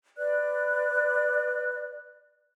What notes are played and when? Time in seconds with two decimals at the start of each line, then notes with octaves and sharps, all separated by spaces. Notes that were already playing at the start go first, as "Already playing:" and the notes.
0.16 B4 D5 F#6